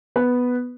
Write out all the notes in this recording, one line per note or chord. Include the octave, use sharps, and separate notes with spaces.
B3 B4